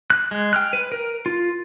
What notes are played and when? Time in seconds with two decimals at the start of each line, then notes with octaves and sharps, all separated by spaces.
0.10 F#6
0.31 G#3
0.53 G5 F6 F#6
0.73 B4
0.92 A#4
1.26 F4